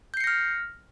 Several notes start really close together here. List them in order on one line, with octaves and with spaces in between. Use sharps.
G6 C7 C#7 A#6 F6